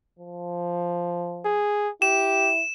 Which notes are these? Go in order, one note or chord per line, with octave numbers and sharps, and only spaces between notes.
F3
G#4
E4 G4 E7